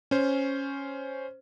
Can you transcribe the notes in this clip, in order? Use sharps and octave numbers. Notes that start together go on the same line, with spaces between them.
C#4 C5